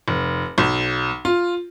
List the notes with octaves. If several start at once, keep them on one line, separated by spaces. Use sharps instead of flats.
F1
B1
F4